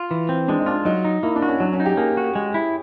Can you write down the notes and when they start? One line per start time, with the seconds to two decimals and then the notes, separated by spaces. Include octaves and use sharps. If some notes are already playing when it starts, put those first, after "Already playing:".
Already playing: F4
0.11 E3
0.29 C4
0.48 G#3 D4
0.60 D#4
0.66 D4 F4
0.85 F#3 D#4
1.05 D#4
1.23 A#3 E4
1.36 D4
1.42 F#4
1.48 C#4
1.60 F#3 D4
1.73 C#4
1.80 D#4
1.85 G4
1.97 A#3 G#4
2.17 F#4
2.35 G#3
2.54 E4